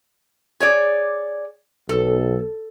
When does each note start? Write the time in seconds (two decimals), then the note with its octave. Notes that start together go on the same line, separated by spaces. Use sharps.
0.60 G#4 C#5 D5
1.89 B1 A4